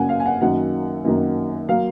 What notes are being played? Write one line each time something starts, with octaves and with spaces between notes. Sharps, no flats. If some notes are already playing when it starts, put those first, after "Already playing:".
Already playing: F#2 C#3 F#3 A#3 F#5 G#5
F5
G#5
F#5
F#2 D#3 F#3 A#3 F#5
F#2 D#3 F#3 A#3
F#3 A#3 F5